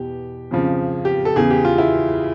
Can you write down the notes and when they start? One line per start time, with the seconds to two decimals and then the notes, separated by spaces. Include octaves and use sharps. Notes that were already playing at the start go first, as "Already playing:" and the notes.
Already playing: E2 B2 G4
0.51 F2 C#3 F3
1.05 G4
1.25 A4
1.36 E2 C#3 E3 G#4
1.50 G4
1.65 F4
1.78 E4